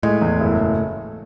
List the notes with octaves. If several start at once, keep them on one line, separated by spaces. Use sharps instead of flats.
A2 G#3
E2
F#1